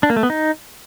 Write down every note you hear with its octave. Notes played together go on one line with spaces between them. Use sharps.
D4
A#3
A3
B3
D#4